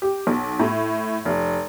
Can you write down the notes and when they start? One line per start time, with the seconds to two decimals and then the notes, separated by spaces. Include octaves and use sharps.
0.02 G4
0.27 B1
0.59 A2
1.25 F1